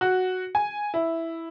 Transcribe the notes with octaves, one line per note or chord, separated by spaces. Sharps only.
F#4
G#5
E4